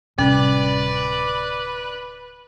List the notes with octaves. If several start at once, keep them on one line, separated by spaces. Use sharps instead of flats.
D1 C3 G3 C#4 B4 D5